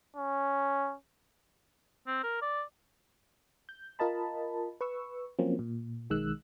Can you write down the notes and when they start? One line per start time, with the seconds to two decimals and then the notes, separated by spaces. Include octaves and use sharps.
0.17 C#4
2.07 C4
2.23 A#4
2.42 D5
3.69 G6
3.99 F4 A#4 D#5 A5 B5
4.81 B4 C#6 E6
5.39 F3 F#3 A#3 C4 C#4
5.59 A#2
6.10 B1 D#3 G#3 E6 F#6